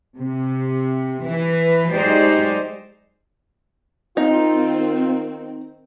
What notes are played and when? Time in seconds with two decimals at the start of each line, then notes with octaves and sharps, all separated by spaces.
0.16 C3
1.23 E3 B4
1.90 F#3 G#3 D#4 G4 C5 D5
4.17 D#3 C4 D#4 F4